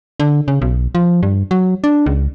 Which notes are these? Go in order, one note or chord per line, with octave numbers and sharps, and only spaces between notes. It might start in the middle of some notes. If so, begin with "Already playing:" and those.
D3
C#3
B1
F3
G2
F#3
D4
C#2